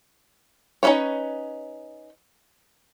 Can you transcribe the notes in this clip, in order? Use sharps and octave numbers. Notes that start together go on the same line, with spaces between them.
C#4 D#4 A4 B4 C#5